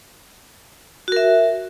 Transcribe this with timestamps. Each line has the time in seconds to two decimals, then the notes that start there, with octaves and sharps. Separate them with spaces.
1.08 F#4
1.12 A#4
1.16 E5